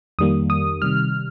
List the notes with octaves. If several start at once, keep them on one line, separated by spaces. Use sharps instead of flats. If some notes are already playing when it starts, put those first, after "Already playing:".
F2 D#3 G3 A#3 D#6
D#6
C3 D#3 G3 F6